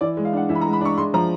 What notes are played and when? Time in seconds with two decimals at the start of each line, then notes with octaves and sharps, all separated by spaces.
0.01 E3 D5
0.17 G#3
0.25 F5
0.33 D4 F#5
0.49 E3 E5
0.55 B5
0.61 A#5
0.65 G#3
0.73 B5
0.81 D4 C#6
0.98 G#3 C6
1.14 F3 A#5